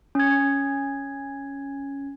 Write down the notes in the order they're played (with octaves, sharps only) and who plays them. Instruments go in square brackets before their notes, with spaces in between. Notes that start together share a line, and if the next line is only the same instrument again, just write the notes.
[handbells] C#4 G#6